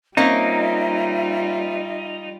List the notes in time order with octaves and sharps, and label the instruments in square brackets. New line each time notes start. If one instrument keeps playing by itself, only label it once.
[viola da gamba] G3 F4 [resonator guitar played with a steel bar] A#3 C4 C#4 [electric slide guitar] D#4 [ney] E5